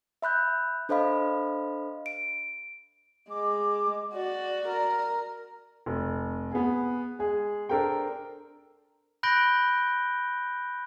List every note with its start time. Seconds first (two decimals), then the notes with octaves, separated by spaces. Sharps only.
0.22 E5 B5 F#6 G6
0.89 D4 A4 C5 D#5 F5 B5
2.06 D7
3.30 G#3 D6
4.14 F#4 D5
4.68 A#4
5.86 F1
6.52 B3 G#4
7.19 G#3 G#4
7.69 D4 A4 A#4 C5 G5
9.23 B5 F#6 G6 A#6 D7 G7